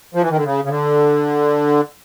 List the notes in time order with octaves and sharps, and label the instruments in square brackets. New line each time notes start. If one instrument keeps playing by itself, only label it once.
[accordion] F3
E3
D#3
D3
C#3
C#3
D3